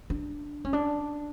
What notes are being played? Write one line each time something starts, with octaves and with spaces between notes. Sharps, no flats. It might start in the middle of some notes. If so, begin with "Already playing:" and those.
D4
C#4
D4